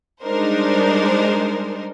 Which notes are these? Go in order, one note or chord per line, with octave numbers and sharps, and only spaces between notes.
G3 G#3 D4 D#4 A#4 C5